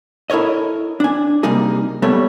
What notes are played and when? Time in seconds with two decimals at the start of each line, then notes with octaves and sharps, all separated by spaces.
0.30 E4 A4 A#4 C#5 D#5
1.00 D4 G#5
1.43 C3 G3 A#3 D#4 G#4
2.02 G3 A3 B3 A4 C#5